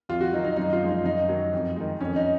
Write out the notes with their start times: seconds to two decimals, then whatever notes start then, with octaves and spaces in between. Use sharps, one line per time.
0.09 F2 F4
0.21 F#4
0.33 D#3 F#3 D#4
0.44 D#4
0.56 F#2 D#4
0.73 F4
0.82 F3 G#3
0.89 D#4
1.04 F#2 D#4
1.28 D#3 F#3
1.53 F2
1.76 D#3 G#3
2.01 F2 C#4
2.16 D#4